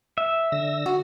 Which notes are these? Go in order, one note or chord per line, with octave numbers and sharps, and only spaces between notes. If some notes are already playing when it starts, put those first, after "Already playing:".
E5
D3 E6 A#6
F#4